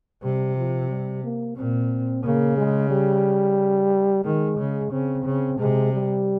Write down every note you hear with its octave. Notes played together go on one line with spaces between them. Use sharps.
C3 G3
F3
G3
A#3
A#2 C4
C#3 A#3
G#3
G3
D#3 G#3
C#3
C#3 C4
C#3
C3 G#3
G3